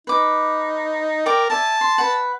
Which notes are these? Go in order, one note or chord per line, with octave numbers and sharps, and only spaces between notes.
D#4 B4 D6
A#4 D5 G5 D6
D5 E5 G#5 A5
C6
B4 F#5